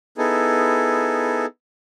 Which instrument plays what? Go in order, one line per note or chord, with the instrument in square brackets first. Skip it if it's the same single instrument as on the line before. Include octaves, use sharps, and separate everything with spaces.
[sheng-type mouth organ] B3 D#4 E4 G#4 A4